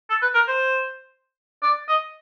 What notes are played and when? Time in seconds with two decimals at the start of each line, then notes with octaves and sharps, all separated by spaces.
0.10 A4
0.22 B4
0.35 A#4
0.48 C5
1.63 D5
1.88 D#5